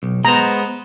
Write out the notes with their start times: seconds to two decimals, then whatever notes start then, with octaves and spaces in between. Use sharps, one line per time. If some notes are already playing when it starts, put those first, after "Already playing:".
0.03 B1
0.25 G#3 B3 C5 A#5